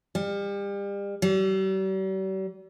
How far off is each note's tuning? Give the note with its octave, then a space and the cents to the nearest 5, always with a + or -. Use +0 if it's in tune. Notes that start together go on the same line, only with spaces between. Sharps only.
G3 +35
G3 -45